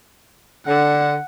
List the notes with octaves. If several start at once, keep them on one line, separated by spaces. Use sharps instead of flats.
D3 F#5